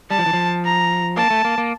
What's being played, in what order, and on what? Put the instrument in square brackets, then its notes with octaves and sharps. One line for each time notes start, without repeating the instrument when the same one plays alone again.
[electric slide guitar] G3 [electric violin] A5
[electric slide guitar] F3
E3
F3
[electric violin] A#5
[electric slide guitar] A#3 [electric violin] A5
[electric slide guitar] A3
A#3
A#3